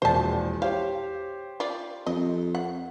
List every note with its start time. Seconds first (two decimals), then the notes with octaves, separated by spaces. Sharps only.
0.02 E1 A#1 E2 C5 A5
0.62 G4 C5 C#5 F5
1.60 F4 D5
2.06 F2 D#5
2.55 F#5